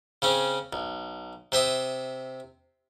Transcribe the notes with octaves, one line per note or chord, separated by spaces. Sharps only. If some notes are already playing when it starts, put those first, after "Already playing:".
C#3 C4 C#4
B1
C3 C5 E5 D#6